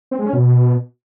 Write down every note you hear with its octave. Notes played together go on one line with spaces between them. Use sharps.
C4
G#3
C#4
B2